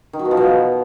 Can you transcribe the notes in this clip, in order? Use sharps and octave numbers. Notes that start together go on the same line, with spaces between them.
D#3
F#3
B2
F3
B2